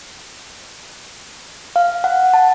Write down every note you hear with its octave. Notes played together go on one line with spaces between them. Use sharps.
F5
F#5
A5